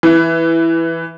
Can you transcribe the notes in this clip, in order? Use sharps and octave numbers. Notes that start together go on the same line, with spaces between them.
E3